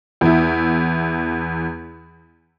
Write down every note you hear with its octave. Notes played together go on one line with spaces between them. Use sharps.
E2 E4